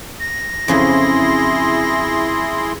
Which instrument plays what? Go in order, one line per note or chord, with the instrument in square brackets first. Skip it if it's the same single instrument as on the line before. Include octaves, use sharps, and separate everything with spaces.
[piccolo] A#6
[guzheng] F2 C#3 F#3 [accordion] E4 G#4 C6